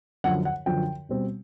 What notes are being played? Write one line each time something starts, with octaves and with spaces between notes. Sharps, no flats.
F#2 D3 F3 F#5
F#5
F#2 D3 F3 G5
B2 G3 C4